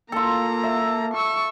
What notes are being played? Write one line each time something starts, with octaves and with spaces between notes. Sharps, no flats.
A#3 F4 A4 A#5
E5
C#6 E6